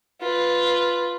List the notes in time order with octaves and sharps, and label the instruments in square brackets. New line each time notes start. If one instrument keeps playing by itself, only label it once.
[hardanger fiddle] F4 B4